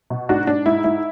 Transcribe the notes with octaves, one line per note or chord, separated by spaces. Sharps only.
B2
G#2 D4 F#4
G#2 D4
G#2 E4
G#2 E4